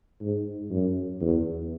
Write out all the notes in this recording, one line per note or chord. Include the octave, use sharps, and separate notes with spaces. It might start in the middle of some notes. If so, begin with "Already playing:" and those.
G#2
F#2
E2